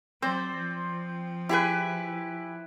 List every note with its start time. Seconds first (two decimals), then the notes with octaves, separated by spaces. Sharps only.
0.22 F#3 C4 C5 D5
0.56 F3
1.49 E4 G4 G#4 B4 G#5